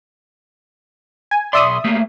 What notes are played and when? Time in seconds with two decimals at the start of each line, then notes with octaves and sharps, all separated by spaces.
1.31 G#5
1.53 B1 D5 E5 C6 D#6
1.85 A3 A#3 G4